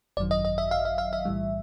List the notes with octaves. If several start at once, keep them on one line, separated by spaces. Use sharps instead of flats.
G#1 F#2 D#3 F#3 D5
D#5
D#5
E5
F5
E5
F5
E5
B1 A2 E3 G3